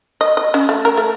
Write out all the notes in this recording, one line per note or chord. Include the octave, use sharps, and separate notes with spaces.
D#5
D#5
C#4
A3
A#4
A3